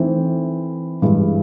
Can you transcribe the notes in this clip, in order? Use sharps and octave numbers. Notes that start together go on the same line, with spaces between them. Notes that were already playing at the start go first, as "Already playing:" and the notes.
Already playing: E3 A3 C4 D#4
G2 E3 G#3